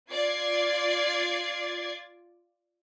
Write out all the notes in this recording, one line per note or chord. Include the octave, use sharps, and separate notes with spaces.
F4 D5 G#6 A6 C7